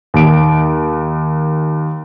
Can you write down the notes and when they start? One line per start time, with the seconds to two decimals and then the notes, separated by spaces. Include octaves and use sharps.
0.14 D#2 D7